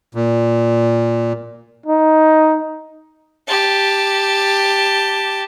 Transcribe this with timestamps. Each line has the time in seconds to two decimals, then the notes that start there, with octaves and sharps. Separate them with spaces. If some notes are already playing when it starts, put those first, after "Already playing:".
0.15 A#2
1.86 D#4
3.48 G4 A5